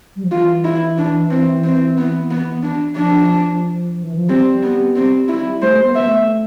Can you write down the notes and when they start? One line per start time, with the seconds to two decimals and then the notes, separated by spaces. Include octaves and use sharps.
0.16 G3
0.24 F3
0.32 E3 F4
0.65 E4
0.98 D4
1.31 C4
1.64 C4
1.98 B3
2.31 B3
2.63 D4
2.96 F3 D4
4.03 E3
4.16 F3
4.29 G3 C4
4.63 B3
4.96 C4
5.28 E4
5.62 A3 C5
5.84 B3
5.95 E5
6.07 A3